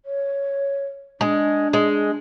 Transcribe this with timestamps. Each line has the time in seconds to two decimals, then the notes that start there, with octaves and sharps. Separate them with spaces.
0.05 C#5
1.21 G#3 D4
1.73 G#3